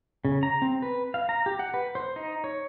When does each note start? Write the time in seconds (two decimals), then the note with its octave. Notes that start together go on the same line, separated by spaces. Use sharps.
0.25 C#3
0.43 A#5
0.62 C4
0.82 B4
1.14 F5
1.29 A#5
1.46 G4
1.59 F#5
1.74 B4
1.95 C5
2.16 D#4
2.44 C#5